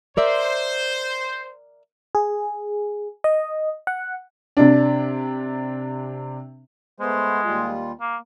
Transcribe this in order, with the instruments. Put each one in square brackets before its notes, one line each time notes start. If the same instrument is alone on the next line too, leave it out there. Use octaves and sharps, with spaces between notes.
[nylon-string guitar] A#4 D5 E5 [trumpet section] C5
[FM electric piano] G#4
D#5
F#5
[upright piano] C3 D4
[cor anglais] G#3 [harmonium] A3 B3 C5
[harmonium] D#2 G3 F4
[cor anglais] A#3